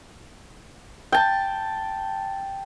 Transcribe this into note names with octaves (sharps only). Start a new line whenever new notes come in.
G5 A5